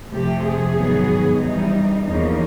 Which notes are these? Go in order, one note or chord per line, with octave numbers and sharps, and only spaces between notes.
F2 C3 F3 A3 G4
G#4
G#2 D#3 F#3 B3
C3 E3 G3 D#4
E2 C#3 F3 A#3 D#4